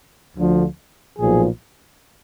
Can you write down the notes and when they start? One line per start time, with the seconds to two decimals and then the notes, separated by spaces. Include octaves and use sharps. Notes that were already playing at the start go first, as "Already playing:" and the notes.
0.37 D2 D3 F3
1.19 B1 A#2 F3 G#4